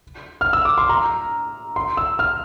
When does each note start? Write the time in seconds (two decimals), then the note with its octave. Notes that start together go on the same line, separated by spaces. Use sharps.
0.41 F6
0.53 E6
0.65 D6
0.78 C6
0.89 A#5
1.76 C6
1.97 E6
2.19 F6